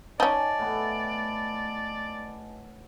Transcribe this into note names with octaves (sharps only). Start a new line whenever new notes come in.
C#4 D#4 D5 D#5 G#5 A5
A2 B3